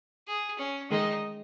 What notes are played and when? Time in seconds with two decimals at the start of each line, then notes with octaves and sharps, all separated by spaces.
0.27 G#4
0.59 C#4
0.91 D#3 G#3 D#4